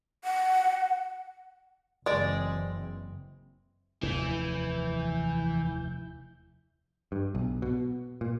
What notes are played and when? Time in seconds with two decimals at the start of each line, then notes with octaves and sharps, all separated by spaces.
0.24 F#5
2.06 F#1 E3 G#3 C4 D5
4.03 F1 D#2 E3 E4 G6
7.12 G2
7.35 B1
7.62 B2
8.21 A#2